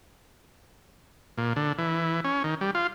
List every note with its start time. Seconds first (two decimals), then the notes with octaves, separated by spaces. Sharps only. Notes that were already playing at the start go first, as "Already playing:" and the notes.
1.38 A#2
1.56 D3
1.78 E3
2.24 C#4
2.44 D#3
2.61 G3
2.75 F4